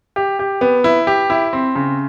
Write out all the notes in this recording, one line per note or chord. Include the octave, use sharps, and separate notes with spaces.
G4
G4
B3
E4
G4
E4
C4
C#3